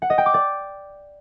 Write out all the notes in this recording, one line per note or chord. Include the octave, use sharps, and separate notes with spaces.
F#5
D#5
G5
D6
D5